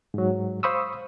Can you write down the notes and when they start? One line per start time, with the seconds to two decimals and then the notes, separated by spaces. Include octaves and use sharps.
0.14 G#2 F#3
0.63 C5 F5 B5 C#6 D#6 E6